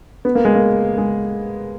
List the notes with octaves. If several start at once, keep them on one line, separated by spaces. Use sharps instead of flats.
B3
A#3
G#3
A#3
G#3